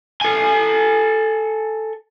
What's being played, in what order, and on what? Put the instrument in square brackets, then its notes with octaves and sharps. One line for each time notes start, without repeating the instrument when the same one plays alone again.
[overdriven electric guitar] A4 G#5